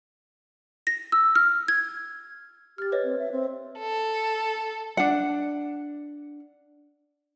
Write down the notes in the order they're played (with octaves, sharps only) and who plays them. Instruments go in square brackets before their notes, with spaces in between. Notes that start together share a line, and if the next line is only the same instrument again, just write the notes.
[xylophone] A#6
E6
F6
G#6
[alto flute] G4 [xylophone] F6 A6
[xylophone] B4 C#5 D#5
[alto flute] C4
E5
C4
[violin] A4
[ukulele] D4 F#5